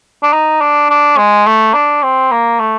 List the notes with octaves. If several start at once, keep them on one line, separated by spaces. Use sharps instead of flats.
D4
D#4
D4
D4
G#3
A3
D4
C4
A#3
A3